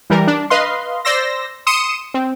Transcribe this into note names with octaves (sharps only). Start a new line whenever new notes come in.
E3 G3 A#4
D4
B4 D#5 F5 C6
C5 D5 C6 E6 A#6
C6 D#6 C#7 E7
C4